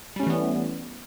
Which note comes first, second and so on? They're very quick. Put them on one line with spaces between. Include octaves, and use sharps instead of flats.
G3 C#4 A3 E3 B3